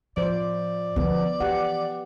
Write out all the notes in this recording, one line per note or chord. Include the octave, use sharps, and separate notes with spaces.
A2 F3 C5 D5
D3 F3 B3
E3 G4 F#5